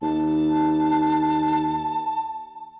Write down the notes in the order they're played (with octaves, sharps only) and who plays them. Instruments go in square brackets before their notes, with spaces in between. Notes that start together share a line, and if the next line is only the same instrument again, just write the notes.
[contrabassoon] D#2 [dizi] A5